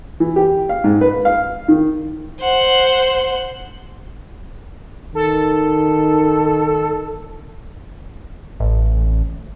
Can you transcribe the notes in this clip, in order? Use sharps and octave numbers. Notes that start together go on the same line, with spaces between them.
E3
G4
F5
G#2
B4
F5
D#3
C5 F#5
D#3 A4
A1